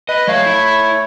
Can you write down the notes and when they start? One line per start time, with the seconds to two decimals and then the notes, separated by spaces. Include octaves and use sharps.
0.09 B4 D#5
0.27 F#3 A3 C#5 F5
0.46 E4 E5